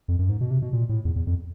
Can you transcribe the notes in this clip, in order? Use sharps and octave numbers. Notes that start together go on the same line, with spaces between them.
F2
F#2
G#2
B2
C3
B2
A#2
A2
E2
E2
F2